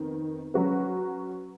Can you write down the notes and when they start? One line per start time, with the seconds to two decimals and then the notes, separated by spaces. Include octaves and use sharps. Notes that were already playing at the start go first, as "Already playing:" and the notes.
Already playing: F2 D#3 B3
0.54 F#3 C#4 F#4 B4